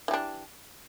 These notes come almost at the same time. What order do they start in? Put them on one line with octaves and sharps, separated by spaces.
E3 G3 D4